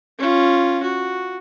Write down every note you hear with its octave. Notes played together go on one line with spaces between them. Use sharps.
C#4 F4
F#4